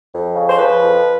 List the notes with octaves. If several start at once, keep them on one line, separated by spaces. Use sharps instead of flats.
F2
C#3
C5
F3 B4
F2